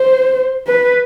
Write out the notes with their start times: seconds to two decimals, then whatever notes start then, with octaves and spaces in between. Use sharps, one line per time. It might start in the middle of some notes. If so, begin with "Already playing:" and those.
Already playing: C5
0.67 B4